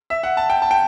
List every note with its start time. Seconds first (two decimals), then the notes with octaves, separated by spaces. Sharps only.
0.10 E5
0.23 F#5
0.37 A5
0.50 G5
0.62 A5
0.71 G5